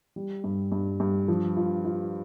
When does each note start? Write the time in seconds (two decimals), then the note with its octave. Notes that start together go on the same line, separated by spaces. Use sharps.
0.16 G3
0.44 G2
0.72 G2
1.00 G2
1.28 F3
1.57 F4
1.85 F4